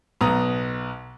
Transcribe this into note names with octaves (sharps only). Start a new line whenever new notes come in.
B1 B3 A#5 D#6